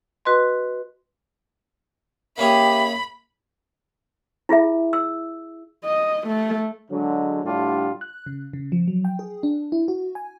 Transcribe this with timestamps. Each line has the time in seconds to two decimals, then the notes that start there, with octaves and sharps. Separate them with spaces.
0.25 F#4 B4 D#5 C6
2.38 A#3 C#4 G4 G#4 E5 B5
4.49 E4 F4 G#4 E5
4.93 E6
5.84 D#5
6.27 A3
6.91 D3 F#3 G#3
7.44 A2 D3 G3 D4 F4 G4
8.01 F#6
8.26 C#3
8.53 C#3
8.72 F3
8.88 F#3
9.05 G5
9.19 G#4
9.43 D4
9.72 E4
9.88 F#4
10.15 G#5